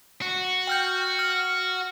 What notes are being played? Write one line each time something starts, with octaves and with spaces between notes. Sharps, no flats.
F#4
G5 F6 G6
F6